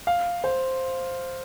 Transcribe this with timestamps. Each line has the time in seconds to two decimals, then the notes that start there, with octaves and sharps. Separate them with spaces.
0.07 F5
0.44 C5